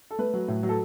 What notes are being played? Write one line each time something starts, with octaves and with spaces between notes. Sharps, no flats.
A4
A3 B4
F#3
A2
F#3
A4